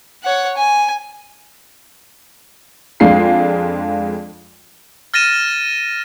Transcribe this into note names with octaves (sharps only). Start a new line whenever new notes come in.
C#5 F#5
G#5
F2 G#3 D4 F4 C7
F6 A6 A#6 D#7 E7